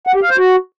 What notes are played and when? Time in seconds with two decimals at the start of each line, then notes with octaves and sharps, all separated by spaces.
0.07 F#5
0.14 G4
0.22 F5
0.30 C5
0.37 F#4